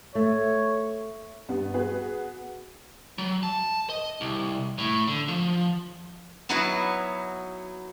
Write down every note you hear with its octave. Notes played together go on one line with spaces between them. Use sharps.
A3 C#5
G2 B3
B3 F#4 G#4 B4
F#3
A5
D#5
C2
A2
D3
F3
F#3 B3 D#4 E4 F#4 B4